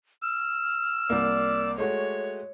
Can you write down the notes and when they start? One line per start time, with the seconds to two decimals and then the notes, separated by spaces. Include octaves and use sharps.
0.22 E6 F6
1.10 C2 A#3 D5
1.78 G#3 A3 F#4 C#5